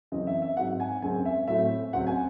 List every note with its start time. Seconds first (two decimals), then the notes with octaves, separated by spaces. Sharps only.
0.12 F#2 C#3 E3 C4 D#5
0.27 E5
0.42 E5
0.57 G#2 F#3 C4 F#5
0.80 G#5
1.02 F#2 C#3 G#3 C4 G#5
1.25 E5
1.48 A2 F#3 A3 C4 E5
1.93 C#2 C#3 F#3 C4 F#5
2.07 G#5